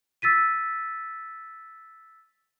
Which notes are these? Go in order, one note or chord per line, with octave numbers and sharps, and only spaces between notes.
E6 A6 B6 D#7